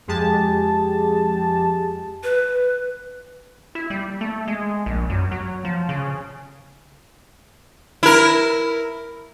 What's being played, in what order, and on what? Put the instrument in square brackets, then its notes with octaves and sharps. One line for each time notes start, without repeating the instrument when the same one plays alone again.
[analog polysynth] F2 G#3 G4 G#4 A5
[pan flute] B4
[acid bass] E4
G3
A3
G#3
A#1
F#2
F#3
F3
C#3
[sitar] E4 A#4